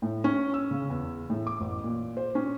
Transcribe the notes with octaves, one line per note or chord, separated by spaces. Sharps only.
A2
C#4
E6
C#3
E2
A2
D6
A1
A#2
C5
C#4